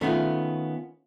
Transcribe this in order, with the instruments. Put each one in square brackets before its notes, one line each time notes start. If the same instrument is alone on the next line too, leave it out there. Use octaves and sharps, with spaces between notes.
[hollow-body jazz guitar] D#3 A3 B3 [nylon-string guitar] C#4 F4